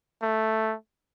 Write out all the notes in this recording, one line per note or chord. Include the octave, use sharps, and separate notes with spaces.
A3